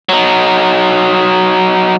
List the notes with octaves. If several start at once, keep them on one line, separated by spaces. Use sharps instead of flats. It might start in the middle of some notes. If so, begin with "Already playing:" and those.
F#3 D#4